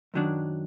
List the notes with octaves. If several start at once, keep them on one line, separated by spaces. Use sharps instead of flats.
F#2 D#3 F#3 A#3 D4